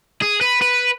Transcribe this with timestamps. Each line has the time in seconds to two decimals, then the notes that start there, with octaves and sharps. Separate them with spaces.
0.22 G#4
0.41 B4
0.62 B4